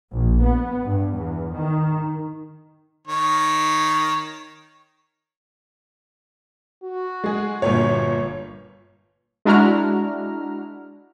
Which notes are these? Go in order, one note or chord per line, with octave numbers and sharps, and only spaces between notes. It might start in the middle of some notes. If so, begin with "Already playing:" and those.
A#1
B3
G2
E2
D#3
D#3 C#5
F#4
G#3 G#4
G1 A#2 C#5
G#3 D4 E4 F#4 A#5 F6